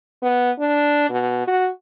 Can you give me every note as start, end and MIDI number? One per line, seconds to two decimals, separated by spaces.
0.22 0.51 59
0.59 1.07 62
1.10 1.45 47
1.47 1.69 66